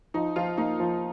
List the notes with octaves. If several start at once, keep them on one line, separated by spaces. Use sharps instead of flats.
F3 D#4
F3 F4
A#3 D#4
F3